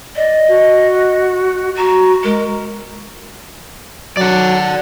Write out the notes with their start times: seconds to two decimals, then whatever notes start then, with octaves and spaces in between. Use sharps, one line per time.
0.16 D5 D#5
0.49 F#4
1.77 F#4 A#5
2.24 G#3 A#4
4.17 F#3 D5 F#5